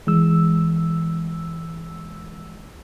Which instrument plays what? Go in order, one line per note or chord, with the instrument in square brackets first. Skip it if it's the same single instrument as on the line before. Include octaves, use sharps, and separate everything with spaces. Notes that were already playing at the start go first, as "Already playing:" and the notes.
[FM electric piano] E3 G#3 E6